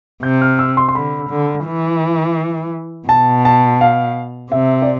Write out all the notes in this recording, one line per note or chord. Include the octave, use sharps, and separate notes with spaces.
C3 G6
F6
E6
C6
C6
D3 B5
D3
E3
B2 A5
A5
F5
C3 E5
D5